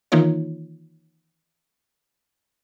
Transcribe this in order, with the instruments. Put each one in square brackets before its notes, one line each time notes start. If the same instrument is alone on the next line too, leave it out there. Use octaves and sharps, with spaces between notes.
[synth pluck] D#3 E3 A#3 D#4 F4 C#5